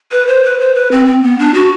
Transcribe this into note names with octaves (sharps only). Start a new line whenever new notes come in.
B4
C5
B4
C5
B4
C4
C4
B3
D4
F#4